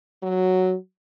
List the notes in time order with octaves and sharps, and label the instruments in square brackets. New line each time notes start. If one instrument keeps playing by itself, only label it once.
[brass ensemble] F#3